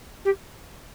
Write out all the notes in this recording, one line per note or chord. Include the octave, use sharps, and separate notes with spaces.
G4